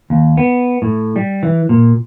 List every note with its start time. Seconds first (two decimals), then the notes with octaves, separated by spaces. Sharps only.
0.10 D#2
0.37 B3
0.82 A2
1.16 G3
1.43 E3
1.69 A#2